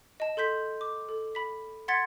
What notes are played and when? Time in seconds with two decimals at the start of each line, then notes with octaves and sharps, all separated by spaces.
0.20 D#5 A5
0.37 A4 C6 G6 B6
0.81 D6
1.09 A4
1.35 B5 B6
1.88 F#5 C6 G#6 A6 B6 C#7